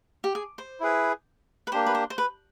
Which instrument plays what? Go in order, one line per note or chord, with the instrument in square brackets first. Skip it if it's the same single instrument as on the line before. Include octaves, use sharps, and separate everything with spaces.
[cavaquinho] G4
G#4
C5
[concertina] E4 G#4 B4
[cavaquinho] B4
[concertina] A#3 D4 G4 [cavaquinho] C5
[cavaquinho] B4
C5
C5
B4